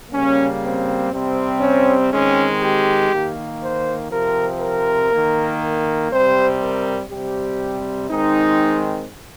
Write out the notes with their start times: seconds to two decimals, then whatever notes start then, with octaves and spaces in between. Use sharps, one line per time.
0.12 C#3 G3 A#3 C#4
0.62 C4
1.12 C3 G3 C4
1.61 C#4
2.12 D#3 G#3 C4 C#4
2.62 G4
3.12 D#3 A#3
3.61 C5
4.10 C3 F3 C4 A#4
4.61 A#4
5.11 D#3 A#3
6.11 C3 G3 C4 C5
6.60 A#4
7.10 C3 G3 C4 G4
8.10 D#3 G#3 C4 D#4